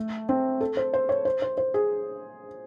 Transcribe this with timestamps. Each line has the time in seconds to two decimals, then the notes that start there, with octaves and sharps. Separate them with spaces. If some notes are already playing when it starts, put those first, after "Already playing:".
Already playing: A3
0.29 C4
0.61 A4
0.77 C5
0.94 C5
1.09 C#5
1.25 C5
1.42 C5
1.58 C5
1.74 G#4